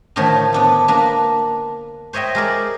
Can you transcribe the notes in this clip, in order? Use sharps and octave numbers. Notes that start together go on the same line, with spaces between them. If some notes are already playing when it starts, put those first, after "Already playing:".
A2 D3 D#3 F3 A3 C#5
B3 D4 A4
A#3 D4 B4
C5 C#5 D#5 E5 G5
G#3 A#4 D5